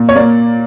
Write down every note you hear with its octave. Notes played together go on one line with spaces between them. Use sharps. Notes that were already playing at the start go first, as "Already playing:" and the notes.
Already playing: A#2
C#5
A#3 D5